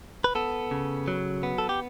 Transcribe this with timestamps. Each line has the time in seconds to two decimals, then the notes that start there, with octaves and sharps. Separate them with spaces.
0.24 B4
0.35 B3 A4
0.71 C#3
1.08 F#3
1.43 B3
1.58 A4
1.69 G4